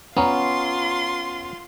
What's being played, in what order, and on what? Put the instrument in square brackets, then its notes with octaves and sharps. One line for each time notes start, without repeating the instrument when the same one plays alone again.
[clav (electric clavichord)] B3 C#4 [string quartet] F4 C6 [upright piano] A#5